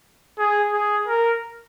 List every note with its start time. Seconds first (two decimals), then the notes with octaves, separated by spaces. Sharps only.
0.38 G#4
0.73 G#4
1.07 A#4